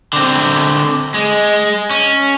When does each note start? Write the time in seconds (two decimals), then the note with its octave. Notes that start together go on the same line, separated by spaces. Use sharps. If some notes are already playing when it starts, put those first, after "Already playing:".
0.13 D3 C4
1.14 G#3
1.91 C#4